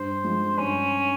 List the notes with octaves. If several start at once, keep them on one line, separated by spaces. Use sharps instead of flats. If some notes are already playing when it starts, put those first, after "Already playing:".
Already playing: G2 C5
F3 G#3
G2 C#4